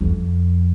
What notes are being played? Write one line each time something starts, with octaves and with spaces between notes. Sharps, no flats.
F2